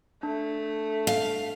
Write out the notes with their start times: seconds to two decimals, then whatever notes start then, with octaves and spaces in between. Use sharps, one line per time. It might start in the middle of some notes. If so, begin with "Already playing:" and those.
0.23 A3 D4
1.07 F5